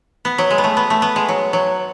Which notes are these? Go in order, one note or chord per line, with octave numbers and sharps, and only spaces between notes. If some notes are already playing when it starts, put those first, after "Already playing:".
B3
F#3
G#3
B3
A3
B3
A3
B3
G#3
F#3
F#3